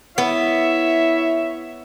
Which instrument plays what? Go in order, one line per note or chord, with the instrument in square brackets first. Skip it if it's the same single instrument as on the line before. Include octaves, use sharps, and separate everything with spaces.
[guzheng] B3 [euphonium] E4 [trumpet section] C#5 E5